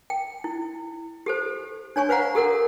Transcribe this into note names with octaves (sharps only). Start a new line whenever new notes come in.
G5
E4
G4 A4 C5
D4 C#5 G#5 C#6
B4 C5 F5 F#5 A#5
G4 A4 A#4 F#5